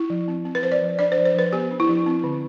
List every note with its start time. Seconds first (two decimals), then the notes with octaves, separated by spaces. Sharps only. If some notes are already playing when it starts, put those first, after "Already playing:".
Already playing: E4
0.10 F3
0.28 C4
0.45 C4
0.55 B4
0.63 F3 C5
0.72 D5
0.82 F3
0.99 D4 D5
1.12 C5
1.17 F3
1.26 C5
1.35 F3 B4
1.53 B3 G4
1.71 D4
1.80 E4
1.89 F3
2.06 C4
2.24 D3